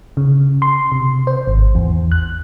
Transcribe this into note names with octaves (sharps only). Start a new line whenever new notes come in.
C#3
C6
C3
C5
G#1
E2
F#6